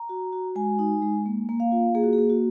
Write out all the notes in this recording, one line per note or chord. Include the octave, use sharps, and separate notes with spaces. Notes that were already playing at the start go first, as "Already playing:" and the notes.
Already playing: A#5
F#4
F#4
G#3 G#5
D#4
G#3
A#3
A#3
F5
F4
A#3 G#4
F#4
G#4
A#3
F#4